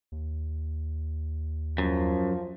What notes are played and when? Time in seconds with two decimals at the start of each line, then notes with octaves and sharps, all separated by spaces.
0.12 D#2
1.78 F#2 F3